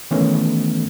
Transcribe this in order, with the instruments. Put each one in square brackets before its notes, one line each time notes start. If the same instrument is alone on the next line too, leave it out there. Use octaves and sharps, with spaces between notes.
[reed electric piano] D#3 E3 A3 B3 C#4